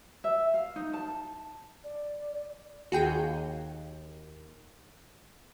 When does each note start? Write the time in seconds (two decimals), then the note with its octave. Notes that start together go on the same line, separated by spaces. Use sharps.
0.24 E5
0.54 F5
0.76 D#4
0.93 A5
1.84 D5
2.92 D#2 F#4 G#4 G5